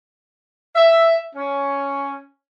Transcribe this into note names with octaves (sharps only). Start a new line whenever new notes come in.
E5
C#4